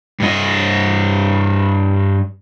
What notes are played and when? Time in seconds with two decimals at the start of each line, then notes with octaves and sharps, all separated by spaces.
0.20 G2 D#5